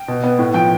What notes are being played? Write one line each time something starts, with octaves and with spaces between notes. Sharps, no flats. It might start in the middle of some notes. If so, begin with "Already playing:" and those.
Already playing: G5
B2
B3
A2
F3 G5